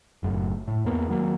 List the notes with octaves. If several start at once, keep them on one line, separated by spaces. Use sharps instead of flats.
F#1 F#2 A2
A2
E2 A#3 B3
D#3 F#3 A#3